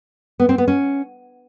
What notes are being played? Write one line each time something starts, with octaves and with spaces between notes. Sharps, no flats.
B3
C4
B3
C#4